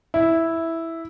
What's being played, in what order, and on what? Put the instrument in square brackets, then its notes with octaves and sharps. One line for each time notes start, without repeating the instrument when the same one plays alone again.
[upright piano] E4